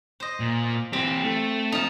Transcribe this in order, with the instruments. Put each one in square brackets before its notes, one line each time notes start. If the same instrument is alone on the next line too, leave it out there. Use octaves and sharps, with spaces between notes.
[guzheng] C5 D#5
[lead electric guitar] A#2
[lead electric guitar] E3 G4 [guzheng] C4
[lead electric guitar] A3
[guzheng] F3 D#4